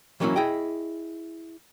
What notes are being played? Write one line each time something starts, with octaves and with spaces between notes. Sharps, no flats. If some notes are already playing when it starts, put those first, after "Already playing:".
E3 F#3 A#3 C4 C#4 E4
E4 G#4 D#5 G5